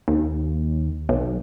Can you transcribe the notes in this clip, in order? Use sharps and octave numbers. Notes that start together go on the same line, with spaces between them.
D#2
B1